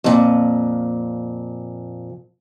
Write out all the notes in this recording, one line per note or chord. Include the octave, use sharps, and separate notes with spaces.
F2 A#2